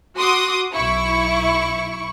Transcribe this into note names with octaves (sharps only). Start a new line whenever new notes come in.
F#4 C6 D6 D#6
B1 E4 C#6